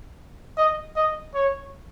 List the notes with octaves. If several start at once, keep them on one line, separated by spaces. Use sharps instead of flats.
D#5
D#5
C#5